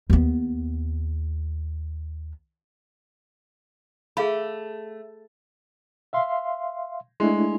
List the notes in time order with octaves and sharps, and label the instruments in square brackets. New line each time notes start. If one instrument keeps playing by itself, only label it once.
[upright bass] D#2 B3
[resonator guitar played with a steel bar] A3 [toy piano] G#4 F5 B5
[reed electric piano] E5 F5 C6
[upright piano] G#3 [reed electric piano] A3 D4 E4